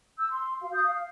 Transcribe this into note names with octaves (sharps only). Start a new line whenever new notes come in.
E6 G6
C6
F#4 F5
F5 D#6 G6
F5